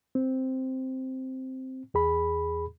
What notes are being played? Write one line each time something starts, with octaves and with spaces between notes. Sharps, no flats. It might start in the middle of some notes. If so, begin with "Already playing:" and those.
C4
E2 G#4 B5